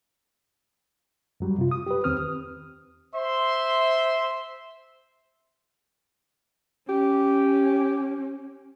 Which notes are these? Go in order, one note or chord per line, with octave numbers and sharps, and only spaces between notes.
F#2 F#3 G3
C3 F4
D#6
G4 B4
E2 D#3 C4 D#6 F6
C5 E5 C6
C#4 G4